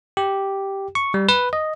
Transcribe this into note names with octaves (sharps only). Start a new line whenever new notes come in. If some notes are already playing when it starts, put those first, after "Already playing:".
G4
C#6
G3
B4
D#5